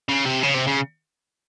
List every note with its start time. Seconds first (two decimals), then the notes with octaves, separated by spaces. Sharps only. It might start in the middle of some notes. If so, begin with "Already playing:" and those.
0.09 C#3
0.26 C3
0.43 C#3
0.54 C3
0.67 C#3